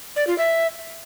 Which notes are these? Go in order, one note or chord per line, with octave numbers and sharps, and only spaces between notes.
D5
F4
E5